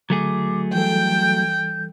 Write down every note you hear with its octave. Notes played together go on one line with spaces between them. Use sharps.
D3 F#3 A3 G#4 D6
E3 G3 A4 G5 G6